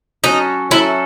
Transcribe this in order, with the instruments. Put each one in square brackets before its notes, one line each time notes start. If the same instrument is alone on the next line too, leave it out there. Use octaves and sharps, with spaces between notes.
[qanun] F#3 C#4 F#4 A4 [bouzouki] D#4
[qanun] F#3 C#4 F#4 A4 [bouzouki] E4